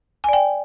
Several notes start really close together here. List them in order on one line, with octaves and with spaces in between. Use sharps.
G#5 D5 G5